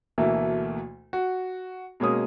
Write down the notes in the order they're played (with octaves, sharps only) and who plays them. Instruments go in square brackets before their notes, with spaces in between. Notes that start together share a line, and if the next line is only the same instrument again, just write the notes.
[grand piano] D2 B2 E3 A3 A#3
F#4
B2 G#3 A#3 C#4 D#6